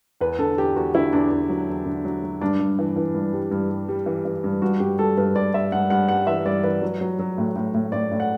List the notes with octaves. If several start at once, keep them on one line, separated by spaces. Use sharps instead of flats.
E2 B4
D3 A4
E2 G4
E2 F#4
D3 E4
E2 D4
E2
F#3
E2
D3
F#3
F#3
G2 D4
G2
E3
E3
G2
G3
G2
G3
G3
E3
E3
G2
G2 F#4
G2 G4
G2 A4
G2 B4
G2 D5
G3 E5
G2 F#5
G2 F#5
G3 F#5
E3 E5
G2 D5
E3 B4
F#3
F#3
F#3
A2
A2
A2
A2 D5
A2
F#5